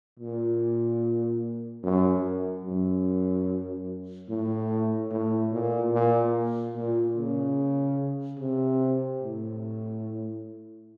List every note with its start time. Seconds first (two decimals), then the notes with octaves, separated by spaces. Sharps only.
0.19 A#2
1.83 F#2
2.65 F#2
4.29 A2
5.11 A2
5.52 A#2
5.93 A#2
6.75 A#2
7.17 C#3
8.39 C3
9.22 A2